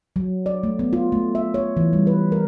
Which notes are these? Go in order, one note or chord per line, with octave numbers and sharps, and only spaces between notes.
F#3
D5
A3
B3
F4
A3
E5
C#5
E3
G3
B4
A#4